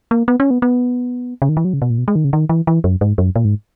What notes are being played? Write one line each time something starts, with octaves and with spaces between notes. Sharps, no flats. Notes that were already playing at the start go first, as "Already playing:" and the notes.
A#3
B3
C#4
B3
B3
C#3
D#3
E3
F#3
C#3
B2
A#2
B2
G#3
D#3
C#3
D#3
E3
E3
F#2
G#2
F#2
A#2
G#2